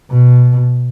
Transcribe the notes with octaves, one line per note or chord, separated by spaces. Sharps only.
B2